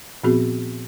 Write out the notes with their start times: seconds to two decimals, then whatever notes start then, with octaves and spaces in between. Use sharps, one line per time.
0.24 A#2 F3 B3 C4 F#4 G#4